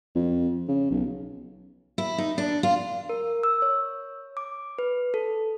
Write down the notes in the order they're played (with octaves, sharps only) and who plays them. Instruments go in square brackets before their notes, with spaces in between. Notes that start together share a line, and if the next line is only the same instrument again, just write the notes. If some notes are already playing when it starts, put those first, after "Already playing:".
[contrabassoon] F2
C#3
B1
[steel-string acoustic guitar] E4
D#4
D4
F4
[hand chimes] A#4
E6
C#5
D6
B4
A4